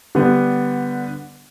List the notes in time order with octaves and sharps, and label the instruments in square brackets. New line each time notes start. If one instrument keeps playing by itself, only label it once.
[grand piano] D3 G3 B3